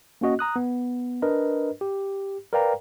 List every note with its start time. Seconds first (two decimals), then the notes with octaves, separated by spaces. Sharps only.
0.21 A#3 C#4 F#4 D#5
0.39 A#5 D#6 F#6
0.56 B3
1.22 D4 A#4 B4 D#5
1.81 G4
2.53 A#4 B4 D5 F5 G5 A#5